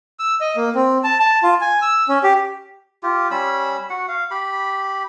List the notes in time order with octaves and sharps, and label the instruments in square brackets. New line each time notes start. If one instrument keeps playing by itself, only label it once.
[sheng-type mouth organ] E6
D#5
A#3
C4
A5
A5
F4
G#5
E6
C#4
G4
[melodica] F4 G4
G3 C#4 B5 E6
F#4 F#5
F5
G4 B5